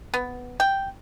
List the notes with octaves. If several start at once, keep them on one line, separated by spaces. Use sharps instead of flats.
B3
G5